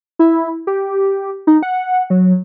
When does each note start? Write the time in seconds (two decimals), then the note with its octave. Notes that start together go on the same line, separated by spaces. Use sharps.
0.19 E4
0.67 G4
1.47 D#4
1.63 F#5
2.10 F#3